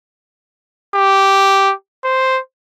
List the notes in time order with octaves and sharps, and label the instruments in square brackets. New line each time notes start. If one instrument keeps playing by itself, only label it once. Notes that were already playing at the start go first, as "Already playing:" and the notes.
[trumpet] G4
C5